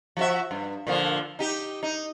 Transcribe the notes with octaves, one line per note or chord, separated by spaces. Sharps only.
F3 F#4 E5
G2
A#2 D3 F3
D#4 G4
D#4